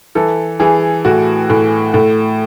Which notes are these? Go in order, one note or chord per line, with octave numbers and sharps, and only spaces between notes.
E3 A4
E3 G#4
A2 F#4
A2
A2